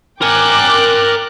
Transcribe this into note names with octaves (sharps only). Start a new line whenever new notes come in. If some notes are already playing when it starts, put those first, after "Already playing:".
A#4 G5 G#5 D6 F#6